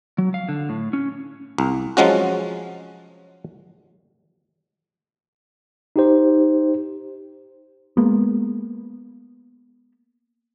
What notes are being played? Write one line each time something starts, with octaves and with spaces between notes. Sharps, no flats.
F#3
F5
D3
A2
C#4
C2
F3 F#3 G#3 C#4 F#4
D#4 G4 C5
G#3 A#3 B3